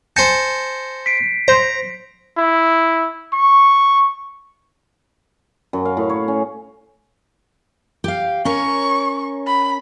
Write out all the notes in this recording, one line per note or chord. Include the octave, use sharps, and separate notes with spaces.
C5 G#5 A5 G6 A#6 C#7
B6 C7 D7
C5 A#5
E4
C#6
F#2
F5
A2
C#5
C#4
G4 F5
C#4 A#4 C#5 C#6
B5